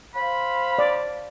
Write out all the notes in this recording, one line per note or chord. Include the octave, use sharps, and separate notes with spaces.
C5 F5 B5
D5